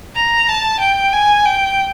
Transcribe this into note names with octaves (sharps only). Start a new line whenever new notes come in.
A#5
A5
G5
G#5
G5